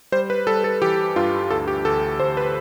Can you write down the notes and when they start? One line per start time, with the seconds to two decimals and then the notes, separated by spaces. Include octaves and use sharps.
0.12 G3 C5
0.30 B4
0.47 G3 A4
0.64 A4
0.82 E3 G4
1.16 G2 F4
1.50 D2 A4
1.68 G4
1.85 D2 A4
2.20 D2 C5
2.37 B4